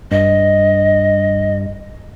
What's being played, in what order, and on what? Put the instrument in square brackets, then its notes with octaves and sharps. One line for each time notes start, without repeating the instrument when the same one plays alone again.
[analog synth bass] G2 [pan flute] D#5